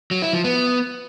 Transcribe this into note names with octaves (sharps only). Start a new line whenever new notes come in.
F#3
E4
F3
B3